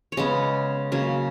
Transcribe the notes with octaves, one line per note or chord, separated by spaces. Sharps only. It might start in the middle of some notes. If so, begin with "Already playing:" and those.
C#5
C#3 G#3 B3 D#5
C#3 F#3 A#3